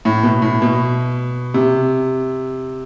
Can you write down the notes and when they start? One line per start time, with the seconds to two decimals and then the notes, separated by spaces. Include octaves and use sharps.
0.05 A2
0.23 B2
0.42 A2
0.62 B2
1.54 C3